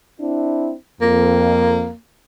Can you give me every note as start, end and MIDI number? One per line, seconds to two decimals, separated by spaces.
0.20 0.74 60
0.20 0.74 62
0.20 0.74 64
1.01 1.88 41
1.01 1.95 58